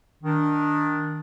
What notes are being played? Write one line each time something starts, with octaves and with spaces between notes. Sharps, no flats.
D#3 D4